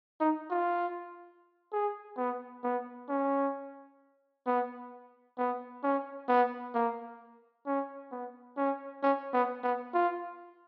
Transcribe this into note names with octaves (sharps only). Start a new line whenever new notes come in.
D#4
F4
G#4
B3
B3
C#4
B3
B3
C#4
B3
A#3
C#4
B3
C#4
C#4
B3
B3
F4